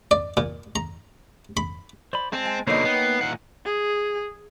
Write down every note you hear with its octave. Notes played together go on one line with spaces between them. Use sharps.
D5
A#2
A#5
B5
C5 D5 B5
G#3 C4 A5
G#5
B2 D3 A#3 D#4 C5 C#5 C7
A#3 B3 G5
A#2 E3 F#5
G#4